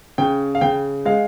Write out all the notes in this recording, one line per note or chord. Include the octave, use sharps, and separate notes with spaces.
C#3 G5
F5
C#3 G5
G#3 F5